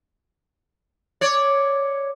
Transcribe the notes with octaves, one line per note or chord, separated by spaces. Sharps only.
C#5 D5